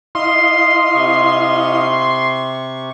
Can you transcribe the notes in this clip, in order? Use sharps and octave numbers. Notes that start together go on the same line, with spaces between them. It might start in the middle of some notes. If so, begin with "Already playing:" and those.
E4 D#5 F5 C6
C3 C#6